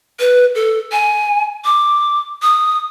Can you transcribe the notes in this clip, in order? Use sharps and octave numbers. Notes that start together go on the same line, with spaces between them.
B4
A4
G#5
D6
D#6